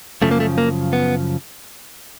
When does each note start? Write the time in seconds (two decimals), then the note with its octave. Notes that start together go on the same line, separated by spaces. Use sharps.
0.22 F#2 C#3 F3 A3
0.31 A#3
0.40 A3
0.58 A#3
0.93 B3